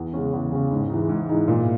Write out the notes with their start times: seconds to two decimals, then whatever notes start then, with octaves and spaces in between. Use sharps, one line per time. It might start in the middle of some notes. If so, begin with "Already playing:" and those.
Already playing: E2
0.13 C#3 G#3 C#4
0.33 E2
0.52 C#3 G#3 C#4
0.71 G#2
0.90 E3 G#3 D#4
1.09 G#2
1.29 E3 G#3 D#4
1.48 A#2